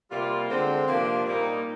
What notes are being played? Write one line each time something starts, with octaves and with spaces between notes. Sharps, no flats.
C3 G3 A#3 F4
D3 G#3 C4
C3 F3 A#3 D4 G4
A#2 G3 A#3 D#4 G4